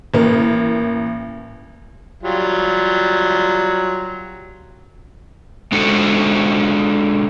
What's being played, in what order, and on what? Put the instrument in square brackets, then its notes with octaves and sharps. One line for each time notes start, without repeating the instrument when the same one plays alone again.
[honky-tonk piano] A1 A#3
[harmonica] F#3 G3 F4
[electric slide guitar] G#3 D4 F#4 A4